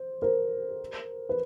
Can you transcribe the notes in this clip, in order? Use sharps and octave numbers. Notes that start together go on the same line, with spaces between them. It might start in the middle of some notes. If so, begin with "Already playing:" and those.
Already playing: C5
A#4 C5
B4